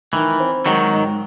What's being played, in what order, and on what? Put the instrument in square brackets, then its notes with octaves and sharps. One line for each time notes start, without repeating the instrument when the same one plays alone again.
[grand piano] D#3 [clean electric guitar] E3
[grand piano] C4
[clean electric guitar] D#3 F#3 [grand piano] G#3
[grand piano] G#2